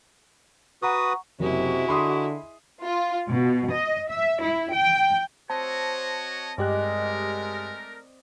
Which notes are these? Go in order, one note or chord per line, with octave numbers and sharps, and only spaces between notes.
F#4 B4 F#5 A#5 C#6 D#6
F#1 C3 G#3 E4 F#4
D3 B5 C6 D#6
F4
B2
D#5
E5
E4
G5
C4 F#4 C5 C#5 D#5 A5
G2 G#3 A3 G4 A#4 D5 D#5 F#6